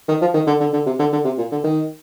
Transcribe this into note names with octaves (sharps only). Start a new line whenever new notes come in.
D#3
F3
D#3
D3
D3
D3
C3
D3
D3
C3
A#2
D3
D#3